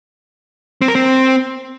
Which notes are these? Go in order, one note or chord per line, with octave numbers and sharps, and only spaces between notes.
C4
A#4
C4